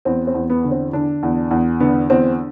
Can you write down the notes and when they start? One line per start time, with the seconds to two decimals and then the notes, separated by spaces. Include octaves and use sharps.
0.05 E2 C4
0.27 C4
0.34 E2
0.50 B3
0.64 D3
0.71 C4
0.93 D3 D4
1.23 E2
1.51 E2
1.80 D3 B3
2.10 E2 C4